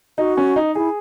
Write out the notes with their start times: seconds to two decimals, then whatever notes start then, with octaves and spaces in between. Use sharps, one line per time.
0.18 D#4 F#4
0.37 C#4
0.56 D#4
0.75 E4 G#4